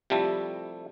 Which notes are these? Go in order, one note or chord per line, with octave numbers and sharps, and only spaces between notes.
C3 F3 G3 A3 E4 A4